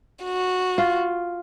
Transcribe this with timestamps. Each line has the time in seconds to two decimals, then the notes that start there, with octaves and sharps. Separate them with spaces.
0.24 F#4
0.78 F4